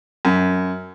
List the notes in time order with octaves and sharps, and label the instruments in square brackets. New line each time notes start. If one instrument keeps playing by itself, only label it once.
[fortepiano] F#2